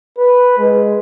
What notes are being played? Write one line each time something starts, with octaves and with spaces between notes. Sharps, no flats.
B4
G#3